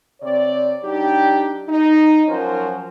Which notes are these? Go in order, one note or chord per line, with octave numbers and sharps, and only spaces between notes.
C3 C4 C#5 D5
F#3 D4 D#4 G4
D#4
F3 F#3 C#4 F#4 A#4 C5